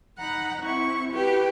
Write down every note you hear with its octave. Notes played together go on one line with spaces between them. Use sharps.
D#4 F#5 A#5 B5
C4 E4 C#6
E4 F#4 G4 B4